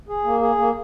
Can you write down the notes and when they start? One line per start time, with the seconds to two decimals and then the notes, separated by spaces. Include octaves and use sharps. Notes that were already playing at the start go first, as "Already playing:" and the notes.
0.09 G#4
0.24 A#3
0.41 G#4
0.58 A#3